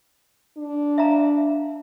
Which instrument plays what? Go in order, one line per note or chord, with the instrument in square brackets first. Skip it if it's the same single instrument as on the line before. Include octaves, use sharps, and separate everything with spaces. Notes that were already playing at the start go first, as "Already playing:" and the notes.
[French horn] D4
[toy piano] E5 F5 A#5